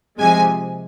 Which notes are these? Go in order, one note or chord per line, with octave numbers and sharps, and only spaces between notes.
C3 F3 G#3 G#5